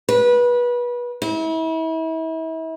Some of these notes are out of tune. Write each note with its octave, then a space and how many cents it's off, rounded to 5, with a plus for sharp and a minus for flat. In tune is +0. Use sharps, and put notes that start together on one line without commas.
B4 -25
E4 -35